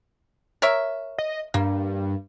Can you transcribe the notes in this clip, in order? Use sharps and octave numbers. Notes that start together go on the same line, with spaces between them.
A#4 C#5 E5
D#5
G2 A#3